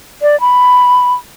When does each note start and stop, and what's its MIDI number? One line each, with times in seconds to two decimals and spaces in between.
0.22 0.39 74
0.40 1.14 83